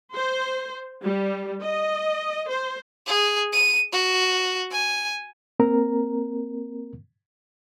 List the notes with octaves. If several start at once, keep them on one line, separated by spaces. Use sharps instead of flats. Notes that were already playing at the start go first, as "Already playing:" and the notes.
C5
G3
D#5
C5
G#4
D#7
F#4
G#5
A#3 C4 A#4 A#5